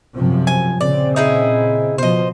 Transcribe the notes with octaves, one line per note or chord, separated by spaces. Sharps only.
F#2 C3 F3
G#5
A#2 C#3 C4 D5
D#4 E4 G#4
B2 F3 C5 D#5